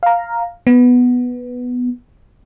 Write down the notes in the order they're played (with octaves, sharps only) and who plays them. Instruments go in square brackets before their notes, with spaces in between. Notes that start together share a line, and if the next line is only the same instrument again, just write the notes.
[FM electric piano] F5 A#5
B3